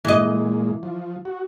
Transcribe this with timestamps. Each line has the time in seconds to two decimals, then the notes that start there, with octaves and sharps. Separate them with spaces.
0.05 A#2 E3 G#3 D#5
0.83 F3
1.25 F#4